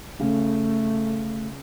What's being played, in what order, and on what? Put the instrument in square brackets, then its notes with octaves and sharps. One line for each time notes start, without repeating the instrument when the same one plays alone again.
[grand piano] C#3 [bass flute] A3